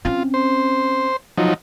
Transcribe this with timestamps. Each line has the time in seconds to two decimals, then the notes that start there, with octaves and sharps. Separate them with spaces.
0.05 C4 C#4 F4
0.34 C5
1.38 F3 F#3 D#4